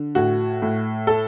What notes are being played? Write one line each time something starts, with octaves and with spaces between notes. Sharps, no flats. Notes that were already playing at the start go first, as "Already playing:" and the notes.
Already playing: D3
A2 F#4
A2
A4